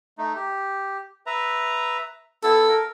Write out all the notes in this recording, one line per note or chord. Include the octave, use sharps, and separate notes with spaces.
A3 D#4
G4
B4 E5 A#5
B3 E4 A4
A#4